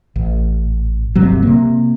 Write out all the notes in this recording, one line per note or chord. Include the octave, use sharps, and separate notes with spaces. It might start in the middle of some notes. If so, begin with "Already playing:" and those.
A1
D1 G1 C3 F#3
C3 A#3